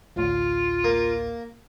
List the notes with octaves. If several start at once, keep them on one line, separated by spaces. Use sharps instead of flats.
A1 D2 A2 F4
A#3